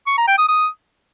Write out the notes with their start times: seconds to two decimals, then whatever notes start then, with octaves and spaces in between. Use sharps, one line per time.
0.07 C#6
0.17 A#5
0.28 G5
0.38 D#6
0.48 D#6